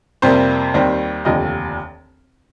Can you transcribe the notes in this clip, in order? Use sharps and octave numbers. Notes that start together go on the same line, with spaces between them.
F2 C3 G3 A#3 C5
D#2 D#3 G3 C4
F1 D#2 D3 F3 D#5